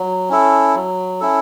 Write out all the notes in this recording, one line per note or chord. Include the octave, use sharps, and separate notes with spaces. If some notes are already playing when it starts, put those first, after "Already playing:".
Already playing: F#3
C#4 E4 A4
F#3
C#4 E4 A4